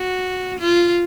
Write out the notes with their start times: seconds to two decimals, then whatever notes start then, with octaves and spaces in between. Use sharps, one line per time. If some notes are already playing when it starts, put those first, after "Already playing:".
Already playing: F#4
0.59 F4